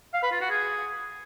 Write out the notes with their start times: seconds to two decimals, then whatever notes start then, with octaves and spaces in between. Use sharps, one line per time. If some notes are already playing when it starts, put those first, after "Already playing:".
0.14 F5
0.23 B4
0.32 F4
0.41 F#4
0.50 G#4